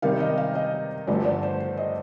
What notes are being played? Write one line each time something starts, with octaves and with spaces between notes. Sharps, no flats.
C3 D#3 G3 F5
D#5
F5
D#5
G2 D3 F3 A3 D5
D5
C5
C5
D#5